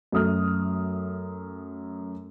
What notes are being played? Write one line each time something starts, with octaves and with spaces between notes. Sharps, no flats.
F#2 A3 D#6 F6